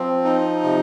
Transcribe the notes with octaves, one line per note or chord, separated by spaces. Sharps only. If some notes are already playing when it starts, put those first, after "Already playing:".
Already playing: F3 C4
D#4
C3